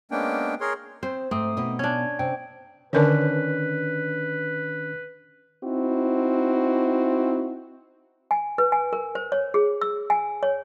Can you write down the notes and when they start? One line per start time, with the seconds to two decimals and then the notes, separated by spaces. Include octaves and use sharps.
0.11 G#3 A#3 B3 C#4 D4 G5
0.61 G#4 A#4 C#5 C6
1.03 C4 C5
1.31 G#2 A3 C4 D#6
1.57 B2 D#4 D#5
1.79 C#4 D4 G#6
2.19 C3 G5
2.93 D3 D#3 C#4 D4 A#4 B4 C#5
5.63 C4 D#4 E4 F#4
8.31 G#5
8.58 B4
8.72 G#5
8.93 A#4
9.15 C5
9.32 C#5
9.54 G#4
9.81 E6
10.10 G#5
10.43 C#5